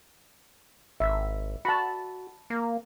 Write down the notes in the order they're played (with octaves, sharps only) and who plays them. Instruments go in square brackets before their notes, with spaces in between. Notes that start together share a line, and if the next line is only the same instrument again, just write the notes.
[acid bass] G#1 [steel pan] E5
[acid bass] F#4 [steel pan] A5 B5
[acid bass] A#3